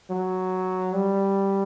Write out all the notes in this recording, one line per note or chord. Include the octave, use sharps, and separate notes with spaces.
F#3
G3